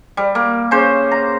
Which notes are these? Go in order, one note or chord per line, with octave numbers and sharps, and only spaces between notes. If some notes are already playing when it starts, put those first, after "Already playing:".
G3
A#3
C#3 C5
A#5